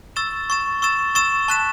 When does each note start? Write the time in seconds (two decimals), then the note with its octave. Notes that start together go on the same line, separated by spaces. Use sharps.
0.16 C#6 E6 A6 E7
0.50 C#6 E6 A6 E7
0.82 C#6 E6 A6 E7
1.15 C#6 E6 A6 E7
1.48 A5 C#6 F#6 B6 E7